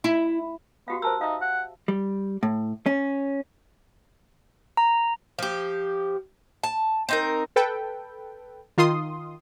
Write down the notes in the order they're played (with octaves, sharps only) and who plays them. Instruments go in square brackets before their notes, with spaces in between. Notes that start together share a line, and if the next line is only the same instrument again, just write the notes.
[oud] E4
[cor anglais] B3 [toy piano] F#4 G4 F5
[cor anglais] A#4 [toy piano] C5 A5 E6
[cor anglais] D#4 [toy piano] E5 F5
[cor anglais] F#5
[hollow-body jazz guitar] G3
A2
C#4
[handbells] A#5
[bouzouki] F3 G4
A5
C4 D#4 A#4
[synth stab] A4 B4 G5
D#3 F4 C6 D#6